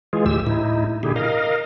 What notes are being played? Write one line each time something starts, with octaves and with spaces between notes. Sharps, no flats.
E3 G#3 F4 G#4
D2 A2 G4 E6
A2 D#4 E4
A#2 D3 E4 G4 G#4
A#4 D#5 F5